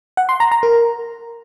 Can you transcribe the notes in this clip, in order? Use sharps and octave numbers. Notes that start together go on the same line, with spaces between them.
F#5
C6
A#5
A#5
A#4